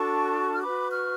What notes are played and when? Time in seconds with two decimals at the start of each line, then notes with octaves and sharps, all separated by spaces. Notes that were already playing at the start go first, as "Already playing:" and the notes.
Already playing: D4 F#4 A4 A5 C#6
0.53 F6
0.63 F#4 B4 B5 D6
0.91 C#6 F6